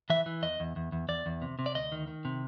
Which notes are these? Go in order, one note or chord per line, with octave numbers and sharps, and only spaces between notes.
E3 E5
E3
E2 D#5
E2
E2
E2
E2 D5
E2
C3
C3
D5
D2 D#5
D#3
D#3
C3